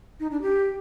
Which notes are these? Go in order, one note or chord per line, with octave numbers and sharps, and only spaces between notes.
D#4
D4
G4